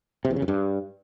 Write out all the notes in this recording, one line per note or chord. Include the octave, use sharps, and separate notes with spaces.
C3
E2
C#3
F#2
G2